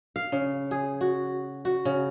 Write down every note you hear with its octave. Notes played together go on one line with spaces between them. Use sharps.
F5
C#3
G#4
F#4
F#4
C#3